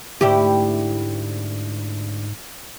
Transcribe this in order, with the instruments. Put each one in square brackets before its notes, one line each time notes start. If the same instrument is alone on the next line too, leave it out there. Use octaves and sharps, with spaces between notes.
[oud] D2 E4 G4 [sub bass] G#2